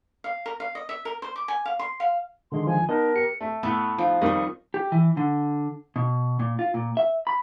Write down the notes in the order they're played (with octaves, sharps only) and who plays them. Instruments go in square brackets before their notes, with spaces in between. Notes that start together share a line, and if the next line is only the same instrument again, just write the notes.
[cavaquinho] F5
A#4
F5
D#5
E5
A#4
C5
D6
G#5
F5
C6
F5
[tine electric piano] D3 D#3 G#3 [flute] C6
[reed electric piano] F3 [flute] G#5
[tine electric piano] B3 B4 A5 [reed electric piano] D#4 D#5 [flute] A#4
[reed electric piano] G4 [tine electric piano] C#7
[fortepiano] A3
[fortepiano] A2 [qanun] A3 B3 B4
[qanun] F3 D#4
[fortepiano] F2 D#3 G3 [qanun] D#5 C#6
[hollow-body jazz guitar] G4
E3
D3
B2
A#2
F4
A#2
E5
B5